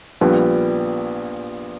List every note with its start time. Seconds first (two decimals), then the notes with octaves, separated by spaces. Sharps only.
0.21 A#1 A#2 G3 B3